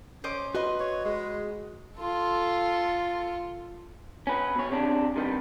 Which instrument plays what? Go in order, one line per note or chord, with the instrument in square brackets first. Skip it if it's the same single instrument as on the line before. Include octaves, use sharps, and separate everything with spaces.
[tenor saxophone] C#4 [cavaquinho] C5 D#5 D6
[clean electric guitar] F#4 D#5 [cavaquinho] B4 C6
[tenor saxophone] C#5
G#3
[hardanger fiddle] F4 A4
[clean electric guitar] C#4 B4
B2 C#5
C3 C#4 D4
C3 D#3 G3 B3